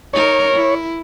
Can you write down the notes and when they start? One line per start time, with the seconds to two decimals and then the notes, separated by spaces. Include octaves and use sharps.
0.13 D#4 A#4 C#5
0.54 E4